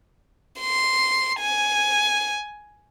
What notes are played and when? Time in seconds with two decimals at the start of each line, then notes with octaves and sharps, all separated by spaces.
0.60 C6
1.40 G#5